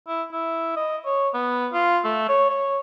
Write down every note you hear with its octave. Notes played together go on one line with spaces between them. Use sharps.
E4
E4
D#5
C#5
B3
F4
A3
C#5
C#5